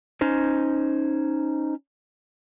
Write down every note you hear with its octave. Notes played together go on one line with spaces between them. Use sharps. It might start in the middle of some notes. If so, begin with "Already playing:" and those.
C#4 D#4 C5